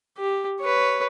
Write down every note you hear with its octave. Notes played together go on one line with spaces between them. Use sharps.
G4
B4 C#5